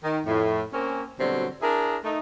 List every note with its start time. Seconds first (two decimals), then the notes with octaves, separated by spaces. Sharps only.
0.03 D#3
0.25 F2 A2
0.73 A#3 C4 C#4
1.19 B2 D3 F#3 G3 C4
1.61 D4 E4 G#4 A#4
2.04 A3 D#4